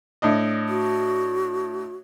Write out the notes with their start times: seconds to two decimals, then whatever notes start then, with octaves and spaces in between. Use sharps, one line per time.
0.22 A2 D4 D#5
0.68 F#4